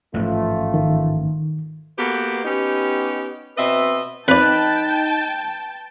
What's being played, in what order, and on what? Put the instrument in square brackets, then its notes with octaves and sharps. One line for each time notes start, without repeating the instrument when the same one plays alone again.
[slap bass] A1 G#2 F3 [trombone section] A3 F4
[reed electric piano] D#3
[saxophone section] A#3 B3 F#4 G4 A4 B4
B3 C#4 D#4 G4
B2 C4 B4 D#5 E5
[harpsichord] F2 D5 [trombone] D#4 [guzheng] B4 [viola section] G5 A5